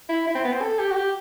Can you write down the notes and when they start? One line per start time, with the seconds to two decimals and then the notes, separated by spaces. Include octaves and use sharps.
0.09 E4
0.27 E4
0.35 C4
0.45 B3
0.52 C4
0.62 A4
0.79 G4
0.91 F#4
0.96 G4